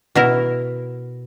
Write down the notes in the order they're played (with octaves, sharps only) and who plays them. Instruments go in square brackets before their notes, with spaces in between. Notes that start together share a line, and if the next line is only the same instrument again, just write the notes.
[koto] B2 E4 A#4